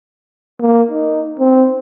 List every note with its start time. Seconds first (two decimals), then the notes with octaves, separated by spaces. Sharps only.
0.60 A#3
0.91 D#4
1.39 C4